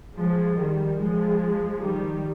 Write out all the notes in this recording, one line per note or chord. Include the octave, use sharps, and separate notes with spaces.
F3 G#3
D#3 G3
F3 G#3
D#3 G3